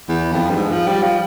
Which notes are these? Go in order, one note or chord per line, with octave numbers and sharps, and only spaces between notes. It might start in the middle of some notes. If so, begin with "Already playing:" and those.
E2
F2
G2
G#2
F3
G3
F3